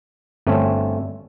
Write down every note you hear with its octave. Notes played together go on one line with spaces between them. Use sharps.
G1 A3 C4 C#4